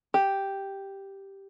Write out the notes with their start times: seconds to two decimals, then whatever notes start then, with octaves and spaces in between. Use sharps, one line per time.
0.14 G4